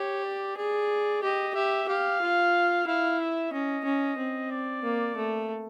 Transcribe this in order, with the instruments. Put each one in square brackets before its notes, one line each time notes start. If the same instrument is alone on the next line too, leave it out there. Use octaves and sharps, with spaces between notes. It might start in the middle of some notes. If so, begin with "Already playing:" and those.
Already playing: [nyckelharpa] G4 [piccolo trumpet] C#5
[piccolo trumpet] D5
[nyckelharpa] G#4 [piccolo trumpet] D5
[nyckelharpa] G4 [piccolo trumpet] D#5
[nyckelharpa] G4 [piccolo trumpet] E5
[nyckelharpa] G4 [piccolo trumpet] F5
[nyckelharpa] F4
[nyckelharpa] E4 [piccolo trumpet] F5
[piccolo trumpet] E5
[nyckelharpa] C#4 [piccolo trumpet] D#5
[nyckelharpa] C#4
C4
[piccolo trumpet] D5
[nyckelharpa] A#3
A3